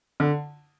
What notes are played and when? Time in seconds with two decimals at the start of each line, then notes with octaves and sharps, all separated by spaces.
0.20 D3